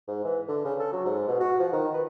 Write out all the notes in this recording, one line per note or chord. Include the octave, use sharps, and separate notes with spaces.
G#2
E3
D3
C#3
A4
F#3
G#2
B2
F#4
F3
D#3
B4